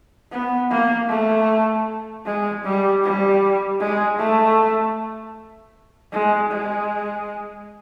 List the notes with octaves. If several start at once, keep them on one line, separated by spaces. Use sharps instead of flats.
B3
A#3
A3
G#3
G3
G3
G#3
A3
G#3
G#3